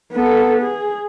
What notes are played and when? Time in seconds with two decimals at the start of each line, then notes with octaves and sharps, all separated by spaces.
0.13 B3 A4
0.61 G#4